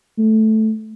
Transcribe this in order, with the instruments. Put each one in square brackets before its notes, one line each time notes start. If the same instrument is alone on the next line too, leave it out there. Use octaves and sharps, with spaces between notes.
[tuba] A3